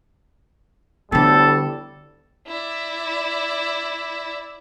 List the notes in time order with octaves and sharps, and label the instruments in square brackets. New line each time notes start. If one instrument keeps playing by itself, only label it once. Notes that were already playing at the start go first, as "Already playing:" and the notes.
[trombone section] D2 A2 G3 [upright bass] D3 B3 [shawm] A4
[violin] E4 D5